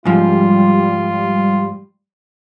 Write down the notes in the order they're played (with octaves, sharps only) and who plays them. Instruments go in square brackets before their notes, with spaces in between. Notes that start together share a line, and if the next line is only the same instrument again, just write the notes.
[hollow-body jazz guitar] G#2 F3 [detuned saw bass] G3 [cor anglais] F4